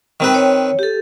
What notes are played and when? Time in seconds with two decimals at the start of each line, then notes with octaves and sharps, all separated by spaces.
0.20 D#3 C4 B4
0.35 C#5
0.79 G4 A4